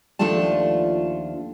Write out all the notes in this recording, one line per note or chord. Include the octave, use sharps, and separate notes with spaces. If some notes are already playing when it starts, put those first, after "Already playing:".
D#2 F3 A3 D4 F4 A5